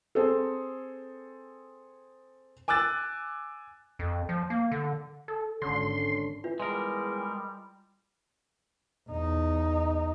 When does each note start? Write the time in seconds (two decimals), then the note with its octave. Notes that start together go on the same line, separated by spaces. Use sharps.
0.15 C4 G#4 A4
2.68 G#5 D6 E6 F#6 A6
3.99 F2
4.29 F3
4.50 A#3
4.72 D3
5.28 A4
5.62 G#1 D3 C#4 D4 C6
6.44 E3 F4
6.60 E2 G3 G#3 A#4
9.10 E2 D#4